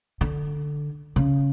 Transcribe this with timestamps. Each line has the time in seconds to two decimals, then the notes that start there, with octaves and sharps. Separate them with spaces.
0.21 D3
1.16 C#3